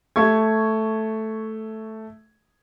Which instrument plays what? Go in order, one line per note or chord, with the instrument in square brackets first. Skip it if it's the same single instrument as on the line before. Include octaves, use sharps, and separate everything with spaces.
[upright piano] A3 C#6 G#6